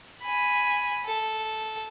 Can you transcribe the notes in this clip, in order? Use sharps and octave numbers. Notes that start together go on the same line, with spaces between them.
G#5 B5
A4